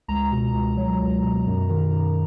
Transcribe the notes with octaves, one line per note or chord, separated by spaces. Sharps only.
C#2 A#5
B2
C#2
F#3
C#2
B2
F#2
D#3
F#2